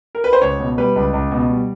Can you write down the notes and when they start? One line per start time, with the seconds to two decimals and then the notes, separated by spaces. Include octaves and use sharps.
0.15 A#4
0.24 B4
0.33 C5
0.41 C#2 C#5
0.60 B2
0.78 G3 B4
0.96 C#2
1.14 C#2
1.31 B2
1.50 G3